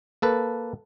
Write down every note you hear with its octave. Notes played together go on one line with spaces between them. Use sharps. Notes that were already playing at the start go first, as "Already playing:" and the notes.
A#3 A4 B4